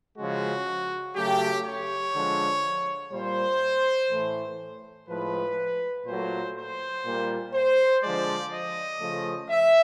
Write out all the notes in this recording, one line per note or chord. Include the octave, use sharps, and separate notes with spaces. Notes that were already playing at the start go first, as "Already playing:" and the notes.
C#3 F3 G#3 F#4
C#3 F#3 A3 G4
C#5
D3 F3 G#3
A#2 G3 A#3 C5
A2 E3 A3
A2 F3 G#3 B4
A#2 F#3 A3 C5
C5
A#2 G3 A#3
C5
D3 F3 G#3 D5
D#5
C#3 F3 A3
E5